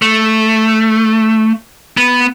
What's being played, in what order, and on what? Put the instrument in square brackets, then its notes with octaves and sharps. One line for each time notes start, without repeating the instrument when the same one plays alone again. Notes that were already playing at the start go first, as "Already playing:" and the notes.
[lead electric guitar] A3
B3